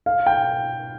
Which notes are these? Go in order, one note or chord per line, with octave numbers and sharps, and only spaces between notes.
F5
G5